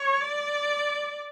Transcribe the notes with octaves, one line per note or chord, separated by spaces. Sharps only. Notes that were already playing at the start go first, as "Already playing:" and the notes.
Already playing: C#5
D5